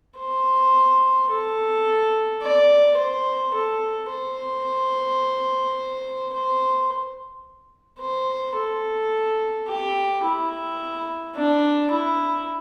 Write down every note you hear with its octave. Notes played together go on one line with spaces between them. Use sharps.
C5
A4
D5
C5
A4
C5
C5
C5
A4
G4
E4
D4
E4